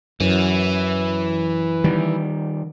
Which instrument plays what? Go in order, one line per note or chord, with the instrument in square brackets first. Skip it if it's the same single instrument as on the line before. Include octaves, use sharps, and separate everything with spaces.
[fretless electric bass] F#2 [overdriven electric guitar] E3
[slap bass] D#3 G3